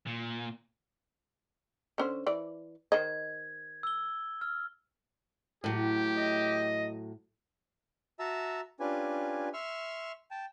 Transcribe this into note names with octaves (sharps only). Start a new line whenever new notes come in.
A#2
D3 C#4 C5
E3 D5
D#3 C5 D#5 G#6
E6 G7
F6
A2 F#3 G4
D#5
F#4 E5 A5 A#5 E6
C#4 D4 F4 G4 B4 G#5
E5 C6 C#6 E6 F6
G5 A5